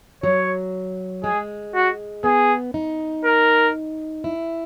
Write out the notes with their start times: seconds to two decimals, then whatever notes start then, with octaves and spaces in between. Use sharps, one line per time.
0.23 F#3 C#5
1.24 G#3 G#4
1.74 F#4
2.24 B3 G#4
2.74 D#4
3.25 A#4
4.24 E4